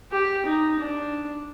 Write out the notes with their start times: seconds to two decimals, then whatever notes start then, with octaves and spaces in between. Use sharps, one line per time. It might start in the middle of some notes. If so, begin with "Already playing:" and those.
0.12 G4
0.46 D#4
0.80 D4